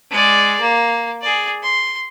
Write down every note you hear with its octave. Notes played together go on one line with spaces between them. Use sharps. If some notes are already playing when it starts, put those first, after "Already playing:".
G#3 D5
A#3
G#4 D5
C6